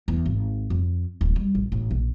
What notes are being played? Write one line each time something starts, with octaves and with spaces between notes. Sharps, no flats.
E2
G#1
F2
D1
G3
A1
A1
A#1